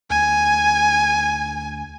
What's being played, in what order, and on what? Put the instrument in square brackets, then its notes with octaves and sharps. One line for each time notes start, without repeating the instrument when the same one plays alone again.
[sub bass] D2 [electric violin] G#5